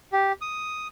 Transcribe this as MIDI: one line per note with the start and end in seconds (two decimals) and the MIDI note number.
0.12 0.32 67
0.42 0.87 87